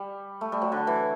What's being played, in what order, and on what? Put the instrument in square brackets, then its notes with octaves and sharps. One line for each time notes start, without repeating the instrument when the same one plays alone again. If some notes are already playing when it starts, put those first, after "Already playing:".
Already playing: [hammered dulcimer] G3
A3
G3
F#3
D3
E3